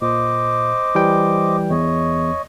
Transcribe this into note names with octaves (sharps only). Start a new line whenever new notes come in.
A#2 C5 D#5 D6
E3 G3 G5
E2 C#5 D#5